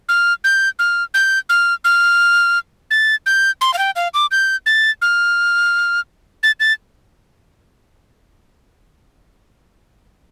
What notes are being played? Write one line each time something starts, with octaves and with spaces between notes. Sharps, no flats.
F6
G6
F6
G6
F6
F6
A6
G6
C6
F5
G5
F5
D6
G6
A6
F6
A6
A6